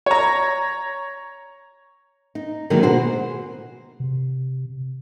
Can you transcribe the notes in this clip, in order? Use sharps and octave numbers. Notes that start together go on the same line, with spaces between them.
C#5 A#5
D#4
D3 D#3 F#3 G#3 A#3 A#4
B2 F#4 G#4 C5
C3